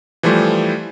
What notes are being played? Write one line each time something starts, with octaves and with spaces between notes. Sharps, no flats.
E3 F3 G3 A3 C5